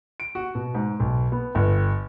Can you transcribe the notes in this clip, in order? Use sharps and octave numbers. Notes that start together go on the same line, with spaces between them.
D7
F#4
B2
G#2
B1
B3
G1